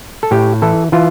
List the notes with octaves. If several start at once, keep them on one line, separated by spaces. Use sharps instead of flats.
A4
A2 G4
E3 A4
E3 F4